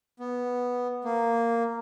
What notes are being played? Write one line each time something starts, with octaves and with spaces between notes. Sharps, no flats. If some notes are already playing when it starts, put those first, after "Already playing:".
B3
A#3